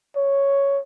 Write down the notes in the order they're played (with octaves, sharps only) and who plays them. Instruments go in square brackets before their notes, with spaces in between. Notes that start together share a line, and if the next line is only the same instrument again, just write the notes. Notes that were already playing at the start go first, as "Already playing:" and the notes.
[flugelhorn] C#5